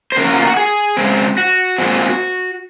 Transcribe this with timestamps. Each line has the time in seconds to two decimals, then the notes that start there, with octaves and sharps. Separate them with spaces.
0.12 C5
0.16 C#3 F#3 A#3 C#4 A#4
0.27 F#4
0.36 F4
0.47 F#4
0.56 G#4
0.97 C#3 G#3 C4
1.37 F#4
1.78 A#2 G#3 C4